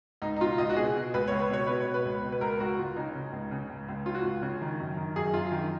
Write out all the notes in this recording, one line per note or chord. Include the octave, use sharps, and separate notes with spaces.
C#2 D#4
D#4
B2 F4
C#2 D#5
F#4
B2 G#4
B2
C#2 B4
C#2 C#5
B4
B2 C#5
B2 B4
C#5
B2
B4
C#2
B2
B4
C#2 A#4
C#2 F#4
C#2 F4
C#3 D#4
C#3
C#2
C#3
C#2
C#2
C#3 F4
F#4
C#2 F4
C#3
D#3
F#2
D#3
F#2 G#4
F#2 F4
D#3